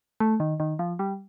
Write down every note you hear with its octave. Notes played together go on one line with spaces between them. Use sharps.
A3
D#3
D#3
F3
G3